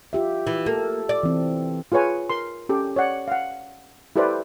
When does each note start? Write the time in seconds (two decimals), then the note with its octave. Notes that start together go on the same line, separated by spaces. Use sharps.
0.13 F4 G4 E5
0.47 E3
0.66 A#3 A4
1.09 D5
1.23 E3 C4
1.92 F4 G#4 B4 C#5 G#5
2.29 A#4 C6
2.69 C#4 G4 A4
2.96 C#5 D5 F#5
3.28 F5 F#5
4.16 E4 G4 A4 B4 C5 D5